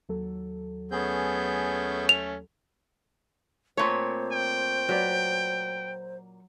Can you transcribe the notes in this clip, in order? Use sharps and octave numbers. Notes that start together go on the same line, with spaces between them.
D#2 F#3 A4
A3 B3 C#4 G#4 G6
F7
A#2 A3 C4 C5 C#5
G5
F#3 B4 D5